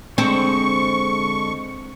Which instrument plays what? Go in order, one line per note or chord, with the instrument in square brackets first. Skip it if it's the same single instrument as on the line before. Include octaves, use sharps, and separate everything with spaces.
[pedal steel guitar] D3 G#3 [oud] C4 [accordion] C#6